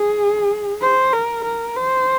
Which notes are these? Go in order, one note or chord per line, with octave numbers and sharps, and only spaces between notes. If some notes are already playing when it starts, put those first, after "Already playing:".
Already playing: G#4
C5
A#4
A#4
C5